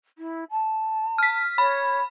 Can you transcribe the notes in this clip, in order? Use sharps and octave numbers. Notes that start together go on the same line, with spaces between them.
E4
A5
F6 B6
C#5 B5